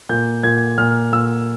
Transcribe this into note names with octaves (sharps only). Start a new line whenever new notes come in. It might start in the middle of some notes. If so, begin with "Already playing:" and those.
A#2 G6
A#2 G#6
A#2 F6
A#2 E6